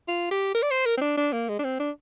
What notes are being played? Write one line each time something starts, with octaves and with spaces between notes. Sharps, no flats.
F4
G4
A#4
D5
C5
A#4
C4
D4
D4
A#3
G#3
D4
C4
D4